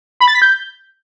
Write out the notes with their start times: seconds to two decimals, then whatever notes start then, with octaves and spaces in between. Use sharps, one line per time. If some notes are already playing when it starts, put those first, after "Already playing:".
0.20 B5
0.28 A6
0.35 B6
0.42 G6